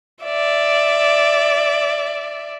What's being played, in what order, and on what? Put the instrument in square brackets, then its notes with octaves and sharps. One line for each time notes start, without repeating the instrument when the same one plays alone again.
[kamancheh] D5 E5